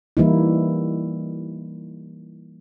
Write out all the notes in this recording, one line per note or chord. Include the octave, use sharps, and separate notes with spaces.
E3 G3 A#3 D#4 E4